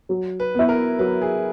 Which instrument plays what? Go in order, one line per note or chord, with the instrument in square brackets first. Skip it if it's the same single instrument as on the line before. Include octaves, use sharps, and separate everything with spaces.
[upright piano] F#3
[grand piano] B4
[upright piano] B3 E4
[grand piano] A#4
[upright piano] F#3 [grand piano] B4
[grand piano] G#4